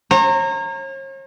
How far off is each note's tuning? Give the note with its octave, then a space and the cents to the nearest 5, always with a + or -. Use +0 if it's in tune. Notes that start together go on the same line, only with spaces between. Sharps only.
C#5 -45 A#5 -20